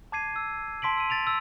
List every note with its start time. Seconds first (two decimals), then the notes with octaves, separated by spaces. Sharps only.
0.12 A5 D6 G#6 C7 D#7
0.36 E6
0.82 A5 C6 B6 D7 F#7
0.97 E6 D#7
1.10 C6 A6 D7 F7
1.27 E6